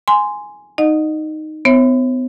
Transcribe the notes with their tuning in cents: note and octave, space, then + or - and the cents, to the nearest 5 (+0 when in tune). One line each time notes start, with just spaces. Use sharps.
G#5 +0 C6 -10
D#4 +0 D#5 -30 F#5 -25
B3 +40 C#5 -40 E5 +0